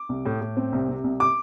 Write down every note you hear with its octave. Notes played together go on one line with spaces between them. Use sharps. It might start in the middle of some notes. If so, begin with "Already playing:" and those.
Already playing: D6
C2
A2
A2
C4
C2
C3
C2
D6